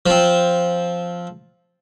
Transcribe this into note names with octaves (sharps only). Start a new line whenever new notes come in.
F3 C4